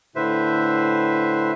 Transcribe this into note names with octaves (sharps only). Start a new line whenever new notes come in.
A2 D3 B4 C5 E5